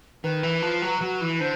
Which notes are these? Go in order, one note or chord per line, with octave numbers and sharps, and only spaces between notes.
D#3 B4
E3
F3
F#3
F#3
E3
D3 C5